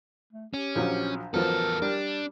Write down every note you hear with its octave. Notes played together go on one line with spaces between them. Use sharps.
A3
C#4 G4
A#1 F3 F#3
E2 F3 F#3 B3 A4 A#4
G3 D4